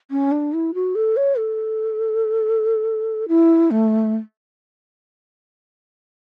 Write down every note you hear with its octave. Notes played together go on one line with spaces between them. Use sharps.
C#4
D4
E4
F#4
A4
C#5
A4
E4
A3